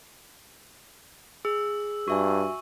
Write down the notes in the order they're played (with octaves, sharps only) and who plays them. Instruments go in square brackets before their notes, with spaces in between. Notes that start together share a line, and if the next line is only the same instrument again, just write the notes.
[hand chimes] G#4 [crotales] E6
[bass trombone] G2 [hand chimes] F#4 E5 G#5 [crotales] C#6